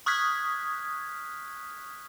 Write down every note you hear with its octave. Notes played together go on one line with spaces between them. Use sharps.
C#6 D#6 F6 F#6 G#6 B6